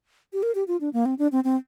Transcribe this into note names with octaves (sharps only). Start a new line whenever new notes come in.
G4
A#4
G4
F4
D4
A#3
C4
D4
C4
C4